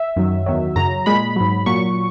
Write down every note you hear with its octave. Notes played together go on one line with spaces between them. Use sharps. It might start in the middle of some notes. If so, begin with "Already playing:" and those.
Already playing: E5
F#2 D#3 F#3
E2 D#3 F#3
F#2 C#3 F#3 A#5
A#2 G#3 B5
G#2 F#3
A#2 F#3 C#6